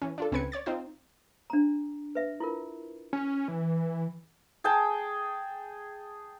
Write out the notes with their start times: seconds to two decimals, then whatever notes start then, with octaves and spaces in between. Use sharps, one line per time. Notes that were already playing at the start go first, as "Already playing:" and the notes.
0.02 E3 C#4
0.18 D4 F4 A4
0.32 C#2 C4 C#4 B4 G#6 C#7
0.52 C#5 D5 A6
0.66 C4 D#4 F4 C5
1.50 D4 A#5
2.15 B4 E5
2.40 E4 F4 A#4
3.13 C#4
3.48 E3
4.64 G#4 G5 A5